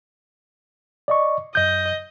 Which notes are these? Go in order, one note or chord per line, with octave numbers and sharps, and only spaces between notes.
D5 D#5 C#6
F#2 D#5 G6